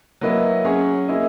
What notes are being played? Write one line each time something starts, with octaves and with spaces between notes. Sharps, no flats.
F#3 A#3 E4 B4 D#5
F#3 C#4 G#4 C#5
A#3 E4 G#4 D#5